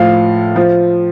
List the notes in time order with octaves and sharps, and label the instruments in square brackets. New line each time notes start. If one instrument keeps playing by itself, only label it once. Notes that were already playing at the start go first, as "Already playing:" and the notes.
Already playing: [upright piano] A2 F3 F5
F3